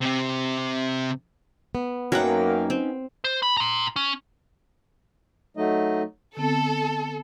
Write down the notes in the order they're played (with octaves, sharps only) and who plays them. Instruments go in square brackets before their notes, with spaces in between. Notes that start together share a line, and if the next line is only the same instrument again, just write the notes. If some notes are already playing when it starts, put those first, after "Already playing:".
[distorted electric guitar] C3 C4
[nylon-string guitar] B3
[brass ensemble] F#2 A#3 [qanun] F#3 F#5 [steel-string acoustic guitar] C#4 D#4 G5
[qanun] C4
[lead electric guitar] C5
B5
A#5 C6
C#4
[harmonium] F#3 A3 D#4 D#5
[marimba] D3 B3 C4 [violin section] A4